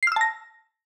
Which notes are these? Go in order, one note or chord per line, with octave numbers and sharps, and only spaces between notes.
A5 E6 F6 A#6 C7